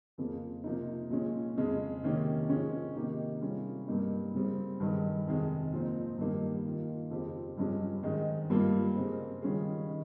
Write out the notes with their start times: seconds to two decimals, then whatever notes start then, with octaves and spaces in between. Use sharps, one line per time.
0.18 F2 C#3 F3 A#3 F4
0.64 C3 F3 A#3 D#4
1.10 A#2 F3 G#3 C#4
1.57 F2 C#3 G#3
2.03 C3 D#3 A#3 C#4 G4
2.49 G#2 F3 G#3 C#4
2.95 C3 D#3 A#3 D#4 G4
3.41 C3 G3 C#4 F4 G#4
3.88 G2 G3 A#3 D#4
4.34 C#3 G3 C4
4.80 G2 D#3 G#3
5.26 F2 C3 D#3 G#3
5.73 A#2 F3 C4 D#4
6.18 G2 D#3 A#3 D#4 G4
6.65 D#3 A#3 F4
7.10 F2 C#3 F3 C4 G4
7.57 G2 F3 G#3 C#4 G4
8.03 G#2 D#3 G#3 D#4
8.50 G2 G3 A#3 F4
8.95 C#3 G#3 C4
9.42 D#3 G3 C#4 F4 G#4
9.89 D#3